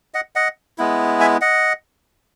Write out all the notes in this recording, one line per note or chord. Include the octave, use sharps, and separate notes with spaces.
D#5 F#5
D#5 F#5
G#3 B3 E4
E5 G#5
D#5 F#5